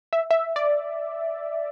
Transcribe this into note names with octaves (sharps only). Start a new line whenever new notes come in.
E5
E5
D5